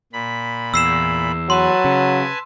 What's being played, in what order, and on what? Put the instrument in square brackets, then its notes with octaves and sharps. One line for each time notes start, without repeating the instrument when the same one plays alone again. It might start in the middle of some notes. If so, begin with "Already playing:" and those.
[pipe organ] A#2 B5
[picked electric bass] E2 [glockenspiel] E6 C7 E7
[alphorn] F#3 [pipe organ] B4 G#5 A5 [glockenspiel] C6
[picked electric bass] C#3